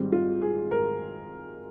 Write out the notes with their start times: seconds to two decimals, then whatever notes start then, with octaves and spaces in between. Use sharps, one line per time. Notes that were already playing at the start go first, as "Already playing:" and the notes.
Already playing: G#1 G#2 G3 C4
0.12 F4
0.41 G#4
0.71 A#4